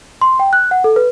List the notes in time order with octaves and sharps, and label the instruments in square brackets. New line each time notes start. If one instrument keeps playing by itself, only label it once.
[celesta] C6
G5
F#6
F#5
A4
B4